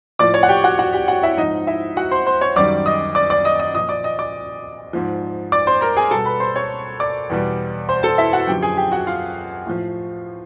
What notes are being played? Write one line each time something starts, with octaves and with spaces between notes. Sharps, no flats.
A2 F3 D5 D6
C#5 C#6
F#5
G4 G5
F#4 F#5
F#4 F#5
G4 G5
F#4 F#5
E4 E5
G#2 F3 D#4 D#5
E4 E5
F#4 F#5
C5 C6
C5 C6
C#5 C#6
F#2 D#3 G3 D5 D6
D#5 D#6
D5 D6
D5 D6
D#5 D#6
D#5 D#6
A#2 F3 D#5 D#6
D5 D6
D#5 D#6
D5 D6
G#2 F3
D5 D6
C5 C6
A#4 A#5
G#4 G#5
B2 G3 A4 A5
B4 B5
C5 C6
C#5 C#6
D5 D6
E2 B2 G3
C5 C6
A4 A5
E4 E5
F#4 F#5
F#2 D3 F3 G4 G5
G#4 G#5
G4 G5
F#4 F#5
F4 F5
A2 F3